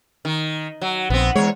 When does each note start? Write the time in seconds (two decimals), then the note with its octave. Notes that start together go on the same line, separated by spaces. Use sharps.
0.25 D#3
0.81 F#3
1.10 A#1 B3 C4
1.36 E2 G#3 C#5